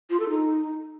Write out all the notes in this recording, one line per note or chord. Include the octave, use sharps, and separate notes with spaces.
F4
A4
D#4